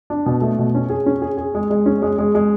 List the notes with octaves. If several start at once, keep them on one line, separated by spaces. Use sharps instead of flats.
D4
B2
A3
B2
C#4
G#4
C#4
G#4
G#4
G#3
G#3
C#4
G#3
G#3
G#3